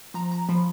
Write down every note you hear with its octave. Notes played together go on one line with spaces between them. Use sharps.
F3 A#5
A#5
F3 B5